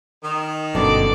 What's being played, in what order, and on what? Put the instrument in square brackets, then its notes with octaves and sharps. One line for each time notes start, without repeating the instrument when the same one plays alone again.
[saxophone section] D#3
[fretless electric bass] G1 F#2 [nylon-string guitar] B2 D3 [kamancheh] D5 D6